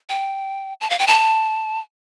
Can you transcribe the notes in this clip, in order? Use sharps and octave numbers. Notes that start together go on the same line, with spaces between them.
G5
A5
F5
G5
A5